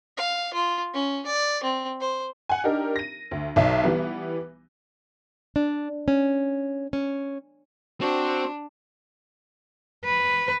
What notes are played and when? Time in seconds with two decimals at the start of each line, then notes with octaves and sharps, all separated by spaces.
0.17 F5
0.54 F4
0.94 C#4
1.26 D5
1.63 C4
2.00 C5
2.49 F#5 G#5
2.64 D4 D#4 G4 A#4
2.96 A#6 D#7
3.31 D2
3.56 B1 F#3 D#4 E5
3.83 E3 G3 B3
5.56 D4
6.08 C#4
6.93 C#4
8.01 C4 D4 F#4
10.05 B4